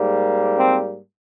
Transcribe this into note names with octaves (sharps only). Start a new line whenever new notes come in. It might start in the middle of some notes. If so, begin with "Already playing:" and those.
Already playing: G#2 G3 A#3
C4